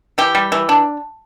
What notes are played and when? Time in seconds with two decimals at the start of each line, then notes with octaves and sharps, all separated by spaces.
0.18 E3 G4
0.35 G3
0.52 E3
0.69 D4